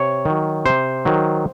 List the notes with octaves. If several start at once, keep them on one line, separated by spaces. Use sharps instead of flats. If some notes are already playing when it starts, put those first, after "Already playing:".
Already playing: C3 C#5
D#3 F#3
C3 C5
D#3 F#3